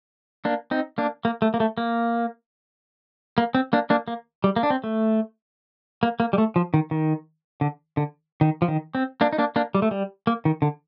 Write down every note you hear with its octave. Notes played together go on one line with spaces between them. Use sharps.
A#3 D4
C4 D#4
A#3 D4
A#3
A3
A#3
A3
A#3
A#3
C4
A#3 D4
A#3 D4
A#3
G3
A#3
D4
C4
A3
A#3
A#3
G3
A3
F3
D#3
D#3
D3
D3
D#3
F3
D#3
C4
A#3 D4
D#4
A#3 D4
A#3 D4
G3
A3
G3
A#3
D#3
D3